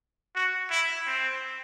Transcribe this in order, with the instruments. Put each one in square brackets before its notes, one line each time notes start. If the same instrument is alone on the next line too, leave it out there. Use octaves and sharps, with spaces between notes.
[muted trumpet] F#4
E4
C4